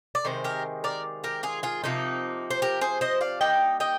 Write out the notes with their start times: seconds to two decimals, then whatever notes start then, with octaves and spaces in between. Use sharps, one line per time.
0.15 D5
0.25 C3 D#3 G#3 C5
0.44 G4 A#4
0.84 A#4 D5
1.24 G4 A#4
1.43 F4 G#4
1.63 F4 G#4
1.84 C3 F3 A#3 D#4
2.50 C5
2.62 G4 A#4
2.81 G#4 C5
3.01 C5 D#5
3.21 D5 F5
3.41 G3 A#3 D#4 D#5 G5
3.80 D#5 G5